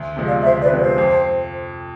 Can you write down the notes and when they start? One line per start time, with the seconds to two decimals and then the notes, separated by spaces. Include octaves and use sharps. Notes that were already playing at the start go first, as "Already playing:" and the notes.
Already playing: D2
0.17 C3 F3 G#3
0.26 D5 F5
0.44 D2 C5 E5
0.61 B4 D5
0.71 C3 F3 G#3
0.80 C5
0.98 F2